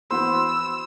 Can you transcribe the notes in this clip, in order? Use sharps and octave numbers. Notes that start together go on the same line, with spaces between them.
E3 B3 F#4 C5 B5 E6